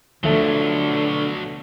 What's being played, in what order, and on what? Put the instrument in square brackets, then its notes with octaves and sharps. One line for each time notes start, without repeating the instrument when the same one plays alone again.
[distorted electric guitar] B2 F#3 [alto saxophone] D3 [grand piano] F3 A3 A4